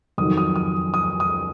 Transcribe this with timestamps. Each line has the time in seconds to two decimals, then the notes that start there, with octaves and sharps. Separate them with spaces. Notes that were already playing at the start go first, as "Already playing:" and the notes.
0.18 F2 D#3 F#3 D#6
0.37 D#6
0.56 D#6
0.94 D#6
1.20 D#6